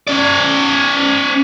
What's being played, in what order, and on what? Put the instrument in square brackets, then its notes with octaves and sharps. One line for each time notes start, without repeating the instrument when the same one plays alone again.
[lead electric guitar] C#4 D5